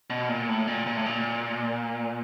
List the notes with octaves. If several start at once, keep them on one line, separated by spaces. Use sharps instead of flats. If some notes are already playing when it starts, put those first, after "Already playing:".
B2
A#2
A2
A#2
A#2
A2
A#2